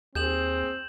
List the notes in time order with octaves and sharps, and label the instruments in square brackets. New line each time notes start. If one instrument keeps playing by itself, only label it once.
[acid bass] D#2 [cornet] C4 [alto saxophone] G#4 [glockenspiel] G6 E7 F#7